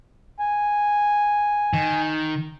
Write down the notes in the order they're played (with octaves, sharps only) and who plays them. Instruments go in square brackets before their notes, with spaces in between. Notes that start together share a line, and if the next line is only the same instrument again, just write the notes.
[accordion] G#5
[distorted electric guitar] D#3